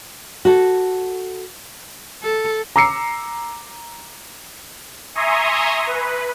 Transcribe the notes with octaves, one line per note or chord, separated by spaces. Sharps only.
F#4 A4
A4
A#5 D6 E6 C7 C#7
E5 G#5 A#5 C6 C#6 D#6
B4